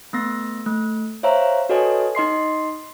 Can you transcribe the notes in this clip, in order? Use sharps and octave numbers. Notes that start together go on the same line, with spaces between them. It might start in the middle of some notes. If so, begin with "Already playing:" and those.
A3 B3 A#6
A3
C5 C#5 E5 F5 A#5
F#4 A4 B4 C#5 D#5 G#5
D#4 D#5 C6 C7